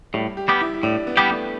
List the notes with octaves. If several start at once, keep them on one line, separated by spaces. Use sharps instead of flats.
A2 G3
G4
G3 B3 G4
E4
E4
A2 D4
B3
G3 B3 G4
A3